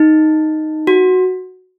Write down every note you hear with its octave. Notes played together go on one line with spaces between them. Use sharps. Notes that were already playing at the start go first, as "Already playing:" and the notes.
Already playing: D#4
F#4